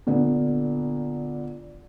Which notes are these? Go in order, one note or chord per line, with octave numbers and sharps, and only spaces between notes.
A#2 D3 B3